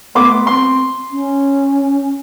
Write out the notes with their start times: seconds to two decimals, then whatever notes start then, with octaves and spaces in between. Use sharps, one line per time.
0.15 A3 B3 C6 D6
0.47 C4 C6
1.12 C#4